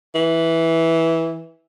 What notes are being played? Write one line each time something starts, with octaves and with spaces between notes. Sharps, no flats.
E3